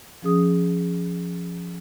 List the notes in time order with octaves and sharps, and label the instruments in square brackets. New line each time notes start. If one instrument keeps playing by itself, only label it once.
[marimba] F3 C#4 G#4 D#6